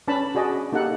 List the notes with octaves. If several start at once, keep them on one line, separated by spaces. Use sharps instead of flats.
C#4 D4 B4 A5 B5
F#4 G#4 D5 D#5
A#3 D#4 G4 A4 F#5